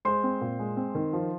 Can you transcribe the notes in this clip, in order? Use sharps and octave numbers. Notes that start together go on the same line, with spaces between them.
G#3 C5 C6
C4
A#2
G#3
C4
D#3
F3